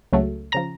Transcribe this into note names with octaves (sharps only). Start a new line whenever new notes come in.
C#2 C#3 F#3 A3
C#3 F3 A#5 A#6